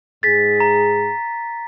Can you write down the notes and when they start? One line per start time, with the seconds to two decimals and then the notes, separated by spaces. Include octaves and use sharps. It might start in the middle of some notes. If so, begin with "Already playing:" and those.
0.23 G#2 G#4 A6 B6
0.60 A#5